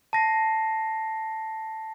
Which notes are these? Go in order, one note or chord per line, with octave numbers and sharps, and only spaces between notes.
A5 A#6 C7